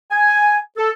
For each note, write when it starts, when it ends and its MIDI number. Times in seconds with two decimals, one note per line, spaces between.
0.11 0.58 80
0.77 0.90 69